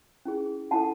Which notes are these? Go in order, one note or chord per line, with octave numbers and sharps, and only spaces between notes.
C#4 E4 G#4
C#4 E4 A4 F#5 A5